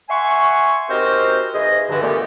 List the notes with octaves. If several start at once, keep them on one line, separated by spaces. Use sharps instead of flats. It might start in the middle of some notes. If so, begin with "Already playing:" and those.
E5 F#5 G#5 C6 C#6
C4 D#4 F#4 G4 A#4 C5
G#2 E3 G#4 D#5
G2 D3 E3
A#2 D3 A3 B3 G4